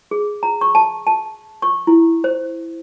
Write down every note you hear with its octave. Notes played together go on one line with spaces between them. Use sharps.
G#4
A#5
C#6
A5
A5
C#6
E4
C5